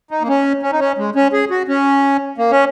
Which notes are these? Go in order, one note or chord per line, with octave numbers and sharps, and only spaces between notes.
D#4
A#3
C#4
C#4
D#4
C#4
G#3
C#4
G#4
F#4
C#4
A#3
C#4